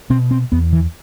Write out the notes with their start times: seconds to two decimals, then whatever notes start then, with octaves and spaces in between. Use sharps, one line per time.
0.10 B2 C4
0.31 C4
0.52 E2 B3
0.73 E3